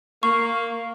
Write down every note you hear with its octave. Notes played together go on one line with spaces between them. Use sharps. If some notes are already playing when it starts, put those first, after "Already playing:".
A#3 C#6